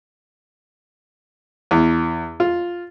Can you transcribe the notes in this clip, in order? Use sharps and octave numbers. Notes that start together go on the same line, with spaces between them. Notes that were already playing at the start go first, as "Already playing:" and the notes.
E2
F4